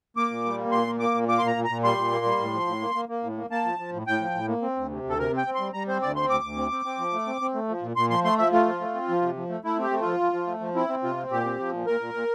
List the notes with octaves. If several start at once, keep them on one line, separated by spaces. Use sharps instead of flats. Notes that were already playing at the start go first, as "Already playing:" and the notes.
A#3 D6
A#2
G3
A#3
A#2 C6
A#3
A#3 D6
A#2
A#3 D6
C6
A#2
A#5
A#2
A#5
A#2
G3 C6
A#2
A#3
G3
A2
F3
A2
A#3
A#3
A#3
A2
A#3
A#3 A5
F3
F3
A2
A2 G5
F3
A2
A#3
C4
D2
C3
D2
A4
C3 A#4
C4
G5
C4
G3 C6
G3 A#5
C4 C5
D2 D5
C4 C6
D2 D6
D2
C4
C4
C4
F3
A3
C4
C4
A3
F3
A#2
A#2 C6
F3 C6
A3 C6
F3 E5
A3 F4
F3
A3
C4
F3
C3
F3
A3
A3 E4
C4 G4
A3
F3 F4
F3
F3
A3
F3
C4 E4
C4
C3 F4
C4
A#2 G4
C4
F3
A#2
A#2 A#4
A#2
A#2